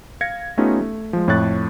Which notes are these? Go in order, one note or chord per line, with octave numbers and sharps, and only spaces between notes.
F5 G#6 A#6 C#7
A3 B3 C#4 D#4 F4 G4
A3
F3 G#3
F2 A2 C#5 C#6 F#6 A6